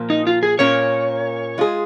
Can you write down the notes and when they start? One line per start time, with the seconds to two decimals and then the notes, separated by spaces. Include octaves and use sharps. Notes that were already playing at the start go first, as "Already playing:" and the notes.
Already playing: A#2 F3 A#3
0.10 D#4
0.27 F4
0.43 G#4
0.59 A#2 A#3 C#4 C#5
1.58 G#3 F4 G#4